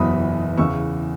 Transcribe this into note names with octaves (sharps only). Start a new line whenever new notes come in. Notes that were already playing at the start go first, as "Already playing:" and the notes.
Already playing: F#1 E2 B2 F#3 B5 D#6
E2 C#3 E3 C#6 E6